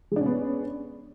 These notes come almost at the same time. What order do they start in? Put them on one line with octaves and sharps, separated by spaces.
G#3 D4 C#4 B3